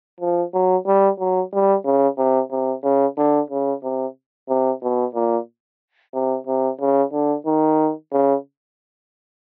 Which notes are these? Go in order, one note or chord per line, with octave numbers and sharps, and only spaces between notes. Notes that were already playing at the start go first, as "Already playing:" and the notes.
F3
F#3
G3
F#3
G3
C#3
C3
C3
C#3
D3
C#3
C3
C3
B2
A#2
C3
C3
C#3
D3
D#3
C#3